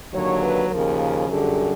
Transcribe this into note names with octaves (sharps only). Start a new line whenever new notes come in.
D#2 D3 F#3 C#5
B4
D#2 C#3 F3 A#4
F#2 D3 G3 G#4